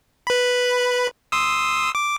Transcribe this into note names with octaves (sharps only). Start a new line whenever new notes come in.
B4 B5
C6 D#6 E6
D6